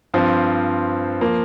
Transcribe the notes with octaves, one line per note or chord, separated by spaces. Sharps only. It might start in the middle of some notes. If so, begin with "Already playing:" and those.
G2 F3 C4
F3 A#3